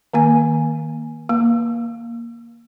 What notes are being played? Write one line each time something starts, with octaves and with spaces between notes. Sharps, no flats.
D#3 A#3 G#5
A#3